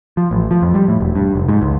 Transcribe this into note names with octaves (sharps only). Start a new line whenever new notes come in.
F3
A1
F3
F2
G3
A2
E1
G2
F1
G#2
C#2